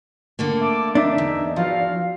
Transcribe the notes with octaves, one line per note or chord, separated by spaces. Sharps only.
D3 A3 A#3
E5 A5 D6
D4 D#4 E5
E2
E2 F3 F#4 F5